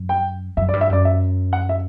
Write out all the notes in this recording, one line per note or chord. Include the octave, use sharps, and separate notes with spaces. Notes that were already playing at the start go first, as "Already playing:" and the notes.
Already playing: F#2
G5
F#2 E5
D5
G2
E5
F#2 D5
E5
F#5
E5